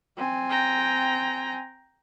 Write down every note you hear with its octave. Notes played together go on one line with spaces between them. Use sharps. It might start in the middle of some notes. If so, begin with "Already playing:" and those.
C4 G#5
G5 A#5